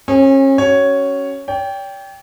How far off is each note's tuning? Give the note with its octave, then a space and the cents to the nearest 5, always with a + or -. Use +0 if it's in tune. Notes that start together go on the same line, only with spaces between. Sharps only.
C#4 -35 G#4 -10
C#4 +0 F#4 +30 C#5 +0
C#5 +45 G5 +5